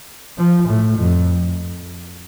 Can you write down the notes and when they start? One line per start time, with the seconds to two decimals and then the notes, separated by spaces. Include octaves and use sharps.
0.38 F3
0.68 A2
0.99 F2